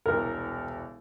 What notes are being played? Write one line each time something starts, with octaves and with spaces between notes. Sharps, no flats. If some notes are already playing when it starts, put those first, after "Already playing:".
E1 C2 A#4